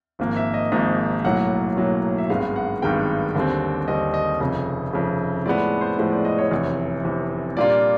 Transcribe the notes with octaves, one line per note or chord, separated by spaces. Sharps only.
G#1 G#2 F3 A#3
E5
D#5
G#1 G#2 F3 A#3 D#5
B1 A2 F#3 A#3 F#5
B1 A2 F#3 A#3
E5
G#1 G2 D#3 G#3 B3 F5
F#5
G#1 G2 D#3 G#3 B3 G5
D#2 D3 G3 C4
D#2 D3 G3 C4 D#5
D#5
F1 F2 C#3 D#5
F1 F2 C#3
A2 F3 G#3 B3 D5
C5
A2 F3 G#3 B3
D5
D#5
C#5
F1 E2 C3
F1 E2 C3
A#2 G3 A#3 D4 F4 D5